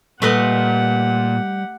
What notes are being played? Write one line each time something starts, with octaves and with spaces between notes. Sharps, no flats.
A#2 G3 A3 G4 B4 D#5 F#5